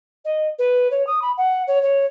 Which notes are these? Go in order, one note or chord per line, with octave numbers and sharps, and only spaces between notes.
D#5
B4
C#5
D#6
B5
F#5
C#5
C#5